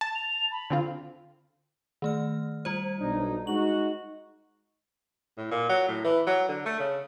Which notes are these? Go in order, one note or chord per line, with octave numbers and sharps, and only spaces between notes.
A5
F7
B5
D3 C4 F4
D#3 A3 F6
G3 F4 C5
B1 D4 D#4
G#3 D#4 F#4 F#7
A2
A#2
F#3
A2
E3
F#3
D3
A3
C#3